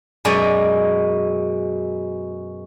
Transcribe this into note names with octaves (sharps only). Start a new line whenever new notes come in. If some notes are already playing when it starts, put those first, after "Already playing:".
F#2 B2 G#3 D5 G#5